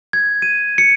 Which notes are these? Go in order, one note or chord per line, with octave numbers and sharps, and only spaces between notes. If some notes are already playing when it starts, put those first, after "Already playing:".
G#6
D#7
C#7